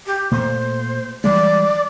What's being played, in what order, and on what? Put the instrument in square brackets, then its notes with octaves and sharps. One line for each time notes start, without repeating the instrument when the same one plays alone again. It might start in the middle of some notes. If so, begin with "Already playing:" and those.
[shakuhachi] G4
[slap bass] A#2 A3 [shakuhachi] C5
[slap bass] E3 G3 G#3 [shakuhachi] D5